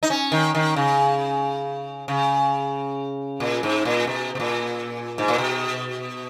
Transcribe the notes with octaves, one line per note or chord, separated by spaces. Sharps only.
D#4
C#4
D#3
D#3
C#3
C#3
A#2
G#2
A#2
B2
B2
A#2
G#2
A#2
B2